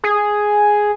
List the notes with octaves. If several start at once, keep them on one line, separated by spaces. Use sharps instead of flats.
G#4